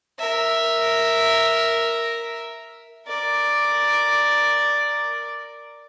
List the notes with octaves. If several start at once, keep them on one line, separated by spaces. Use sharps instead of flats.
A#4 E5
A#4 D5